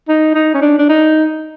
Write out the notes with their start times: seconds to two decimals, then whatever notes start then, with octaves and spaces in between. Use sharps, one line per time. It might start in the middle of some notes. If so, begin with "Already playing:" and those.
0.08 D#4
0.34 D#4
0.54 C#4
0.61 D4
0.79 D4
0.89 D#4